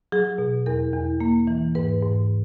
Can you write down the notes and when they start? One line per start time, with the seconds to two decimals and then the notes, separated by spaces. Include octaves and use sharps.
0.12 F#3 G#4
0.38 B2
0.66 E2 A#4
0.93 E2
1.20 A#3
1.47 E3
1.75 G#2 B4
2.02 G#2